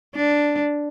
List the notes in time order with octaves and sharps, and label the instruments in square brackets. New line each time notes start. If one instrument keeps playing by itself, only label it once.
[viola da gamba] D4